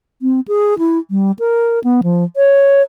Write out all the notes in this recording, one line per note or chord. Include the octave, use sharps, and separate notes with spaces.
C4
G#4
E4
G3
A#4
B3
F3
C#5